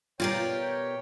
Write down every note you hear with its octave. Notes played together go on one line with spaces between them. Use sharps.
B2 F4 G4 A#4 C#5 D5 F5 G5